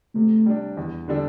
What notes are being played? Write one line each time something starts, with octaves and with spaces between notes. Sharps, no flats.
C3 A3
G3 D4
E2
D3 G3 D4 A4